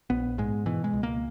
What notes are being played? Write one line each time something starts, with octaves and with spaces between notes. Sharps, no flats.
A#1 B3
G#2 G#3
B2 E3
G#3
C#2
A#3